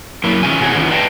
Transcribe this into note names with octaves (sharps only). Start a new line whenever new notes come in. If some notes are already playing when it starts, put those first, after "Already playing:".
F#3 A#3 E4
D#3 G#3 C#4 E4 F4 G#5
C3 E3 C#4 F#4 G#4
D#3 E3 B3 C#4 F4
B4 D5 D#5 F5 G5 A5